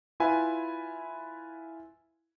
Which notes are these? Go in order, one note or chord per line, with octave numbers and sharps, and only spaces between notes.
E4 F4 B4 E5 G#5 B5